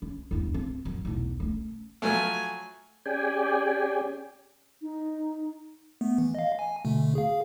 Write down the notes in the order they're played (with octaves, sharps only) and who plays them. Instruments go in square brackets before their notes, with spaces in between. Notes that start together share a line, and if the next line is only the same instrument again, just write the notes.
[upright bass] C#4
E2 G2
C4
F#2
B1 E2
A3 C#4
[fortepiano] F3 F#3 A3 [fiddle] G#5
[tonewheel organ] C#4 G4 G#4 D5 G5 G#5
[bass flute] D#4
[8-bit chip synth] A3 B3
E3
D#5 F5
G#5
B2 D3 A3
G#4 F5